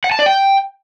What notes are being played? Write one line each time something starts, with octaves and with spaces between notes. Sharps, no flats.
F#5
A5
D5
G5